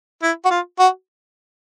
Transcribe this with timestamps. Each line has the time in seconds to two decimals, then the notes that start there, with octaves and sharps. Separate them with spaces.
0.23 E4
0.45 F#4
0.51 F4
0.79 F#4